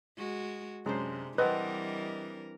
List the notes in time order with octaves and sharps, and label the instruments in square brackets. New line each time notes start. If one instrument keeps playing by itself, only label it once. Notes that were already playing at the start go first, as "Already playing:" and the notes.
[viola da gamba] G#3 F#4
[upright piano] F#2 [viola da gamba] C3 [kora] G#3 D4 C5
[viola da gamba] E3 G3 A#4 [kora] C4 D4 [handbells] B4 [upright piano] D#5 F#5